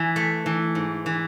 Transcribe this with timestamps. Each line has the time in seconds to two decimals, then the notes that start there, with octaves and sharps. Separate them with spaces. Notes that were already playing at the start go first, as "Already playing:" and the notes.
Already playing: E3 G#5
0.16 A3
0.46 E3
0.75 G#2
1.06 E3